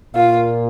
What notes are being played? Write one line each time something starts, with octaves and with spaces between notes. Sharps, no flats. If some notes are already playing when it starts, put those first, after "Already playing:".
A#2 F4